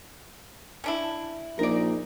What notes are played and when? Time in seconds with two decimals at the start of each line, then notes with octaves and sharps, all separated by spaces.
0.84 C#4 D4 E4
1.59 A#1 D#4 A#4 D5